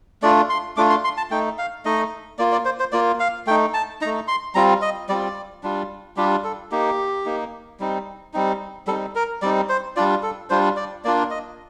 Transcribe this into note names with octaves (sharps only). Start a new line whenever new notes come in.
A3 D4 F4 D5
C6
A3 D4 F4 D6
C6
C6
A5
A3 D#4 G5
F5
A3 D#4 D#5
A#3 F4 D5
D5
C5
C5
A#3 F4 D5
F5
A3 D#4 G5
A5
A3 D#4 A#5
C6
G3 C4 F4 A#5
D#5
G3 C4 F4 D5
G3 D4 F4
G3 D4 F4 G4
A4
A#3 D#4 G4
A#3 D#4
G3 C4 D#4
G3 C4 D#4
G3 C4 D#4 A4
A#4
G3 C4 D#4 D5
C5
G3 D4 F4 D5
A4
G3 D4 F4 C5
D5
A#3 D4 F4 D5
D#5